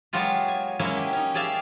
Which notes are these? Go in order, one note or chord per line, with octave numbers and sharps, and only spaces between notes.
F#3 G#3 B3 F4 G4
G#5
F#3 G#3 A#3 C#4 E4
G4
C#4 D#4
G4 G#4 D5 E5 F5